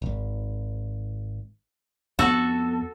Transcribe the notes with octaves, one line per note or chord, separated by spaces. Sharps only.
D#1 G#1
F2 B3 F#4 A4